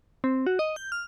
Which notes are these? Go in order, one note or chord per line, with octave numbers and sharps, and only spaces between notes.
C4
F#4
D#5
G6
F6